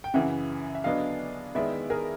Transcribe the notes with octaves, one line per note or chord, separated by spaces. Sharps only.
G5
F#2 C#3 E3 E5 F#5
E5
D3 F#3 B3 D4 D#5 F5
D#3 G#3 B3 E4 D5 E5
G#4 A#4